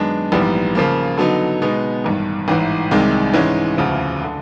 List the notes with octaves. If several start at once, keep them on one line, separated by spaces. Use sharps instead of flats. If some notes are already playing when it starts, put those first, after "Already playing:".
Already playing: F#2 D#3 G#3 B3 D4
A#1 G#2 E3 G3 B3
C#3 F3 A#3
D3 F#3 B3 D#4
B2 G#3 B3 D#4
A1 G2 D#3
A1 G#2 E3
C2 C3 D#3 G#3
G#2 E3 G#3 C#4
E1 D2 C#3 F3
D3